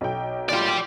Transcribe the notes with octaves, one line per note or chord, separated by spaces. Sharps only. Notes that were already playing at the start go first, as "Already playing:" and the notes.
B1 G5
A#2 F#3 F4 G4 D5